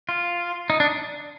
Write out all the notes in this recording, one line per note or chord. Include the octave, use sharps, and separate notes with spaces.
F4
D#4
D4